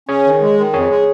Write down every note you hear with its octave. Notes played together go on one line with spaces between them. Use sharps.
C#4 G#4 C#5
D#3
G#3
D#3
F2 G#4 C#5
G#3